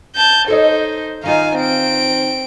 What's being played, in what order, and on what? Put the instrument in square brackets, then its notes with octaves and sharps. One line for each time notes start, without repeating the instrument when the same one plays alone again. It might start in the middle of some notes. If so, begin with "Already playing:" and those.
[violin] A5 G6
[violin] D#4 C5 [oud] A4 C#5 D#5
[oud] D#3 D#4 F4 [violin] F5 G#5
[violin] C4 D7